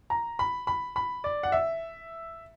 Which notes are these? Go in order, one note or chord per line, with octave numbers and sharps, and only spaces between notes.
A#5
B5
B5
B5
D5
F#5
E5